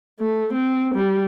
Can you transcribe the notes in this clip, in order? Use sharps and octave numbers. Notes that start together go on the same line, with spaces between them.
A3
C4
G3